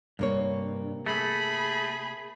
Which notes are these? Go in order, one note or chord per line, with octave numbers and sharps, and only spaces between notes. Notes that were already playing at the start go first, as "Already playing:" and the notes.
G2 C3 A#3 C#5
A3 G#4 B5